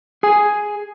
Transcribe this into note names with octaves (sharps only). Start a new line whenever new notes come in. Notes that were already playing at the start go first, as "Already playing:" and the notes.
G#4 G#5